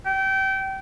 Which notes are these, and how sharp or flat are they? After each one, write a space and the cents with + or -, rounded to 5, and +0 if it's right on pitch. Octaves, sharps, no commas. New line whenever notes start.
G5 -25